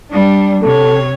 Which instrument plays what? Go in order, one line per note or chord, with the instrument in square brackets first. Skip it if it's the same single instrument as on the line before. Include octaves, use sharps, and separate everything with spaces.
[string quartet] G3 D4
[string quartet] C3 C#5 [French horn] A4